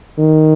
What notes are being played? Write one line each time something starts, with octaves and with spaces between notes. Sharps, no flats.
D#3